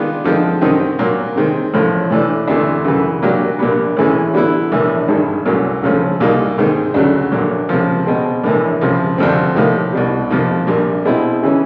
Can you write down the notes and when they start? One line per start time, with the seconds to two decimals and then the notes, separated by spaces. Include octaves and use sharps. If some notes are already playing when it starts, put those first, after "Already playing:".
Already playing: D#3 G#3 B3 D4 F4
0.24 D3 F3 G#3 C4 D#4
0.61 F#2 D#3 G3 C4 D#4
0.99 A#2 F#3 A#3
1.35 C3 D#3 G#3 C4
1.74 A1 A2 F3
2.10 A2 E3 A3 D4
2.48 D2 C3 E3 A3 D4
2.84 F#2 C#3 E3
3.22 A#2 F#3 A#3 D4 G4
3.59 A#1 A#2 G3 B3
3.97 A1 A2 E3 G#3 C#4
4.34 D3 G3 B3 E4
4.72 A#1 A2 E3 A3
5.08 G#1 G2 D#3 G#3
5.45 C2 A#2 F#3 A3 C#4
5.83 C#2 C#3 F3 A3 C#4
6.20 C2 A#2 G3 A#3 D#4
6.58 G#2 D#3 G#3 C4 D#4
6.94 D2 C#3 F#3 A3
7.32 A#1 A#2 F#3
7.69 C#2 C3 F3
8.06 B2 G#3 C4
8.44 A#1 A2 E3
8.81 C#2 C3 F3
9.18 D2 C3 F3 A3 C4
9.55 A2 F3 A#3 D#4 G4
9.93 C2 B2 G3
10.30 F2 C3 F3 A#3 D#4
10.67 A#1 A#2 G3
11.05 B2 G#3 C4 E4
11.42 C#3 E3 G#3 C#4